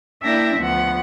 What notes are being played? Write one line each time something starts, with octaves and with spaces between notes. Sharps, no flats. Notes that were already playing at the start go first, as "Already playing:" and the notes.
A#3 D4 E4 E5 G5 A#6
D2 F3 B3 F#5